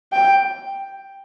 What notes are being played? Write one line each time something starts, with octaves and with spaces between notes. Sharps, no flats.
G5